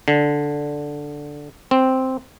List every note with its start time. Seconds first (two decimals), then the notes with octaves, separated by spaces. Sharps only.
0.08 D3
1.71 C4